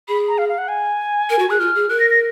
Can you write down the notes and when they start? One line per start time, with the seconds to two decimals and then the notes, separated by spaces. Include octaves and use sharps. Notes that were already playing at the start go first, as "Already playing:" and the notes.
0.08 G#4 B5
0.28 A#5
0.38 F5
0.49 F5
0.58 F#5
0.68 G#5
1.30 A#4
1.39 F#4
1.50 G#4 F#6
1.60 F4 F6
1.75 G#4
1.89 A#4 F#6
2.00 A#6
2.10 A#6